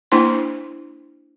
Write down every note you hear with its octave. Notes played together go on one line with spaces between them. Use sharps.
A#3 D4 E4 C5 C6